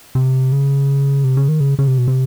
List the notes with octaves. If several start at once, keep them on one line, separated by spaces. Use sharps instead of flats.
C3
C#3
C3
C#3
D#3
C#3
C#3
C3
B2
C3